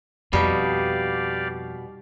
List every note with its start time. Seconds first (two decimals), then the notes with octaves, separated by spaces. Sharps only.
0.33 F2 B2 G3 D#4 G4 D5 F5